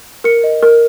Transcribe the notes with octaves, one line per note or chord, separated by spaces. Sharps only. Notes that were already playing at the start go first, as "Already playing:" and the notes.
A#4 C#7
D#5
A#4